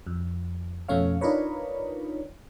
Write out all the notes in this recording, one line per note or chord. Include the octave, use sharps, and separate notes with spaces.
F2
F2 B2 A3 C#4 C#5 F5
D4 D#4 F4 A#4 B4 C#5